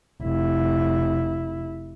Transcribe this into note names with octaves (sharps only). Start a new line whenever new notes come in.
F1 E4